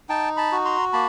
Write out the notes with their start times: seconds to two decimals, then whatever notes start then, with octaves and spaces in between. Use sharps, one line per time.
0.09 D#4 G5 A5
0.37 A5 B5
0.52 F#4
0.65 A#5 C6
0.93 A#3 A5 B5